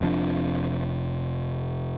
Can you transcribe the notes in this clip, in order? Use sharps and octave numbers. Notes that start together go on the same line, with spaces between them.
F1 C3 F3 D4